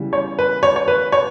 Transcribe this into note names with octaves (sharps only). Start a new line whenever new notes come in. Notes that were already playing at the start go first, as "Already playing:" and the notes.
Already playing: C#3 E3 G3 B3
C#5
B4
C#5
C#5
B4
C#5